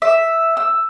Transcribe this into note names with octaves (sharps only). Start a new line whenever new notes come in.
E5
E6